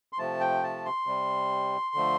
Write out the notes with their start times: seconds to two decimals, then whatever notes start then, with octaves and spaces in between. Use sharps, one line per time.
0.13 C6
0.18 C3 F3 A3 A5
0.41 G5
0.63 A5
0.85 C6
1.06 C3 G3
1.95 D3 F3 A3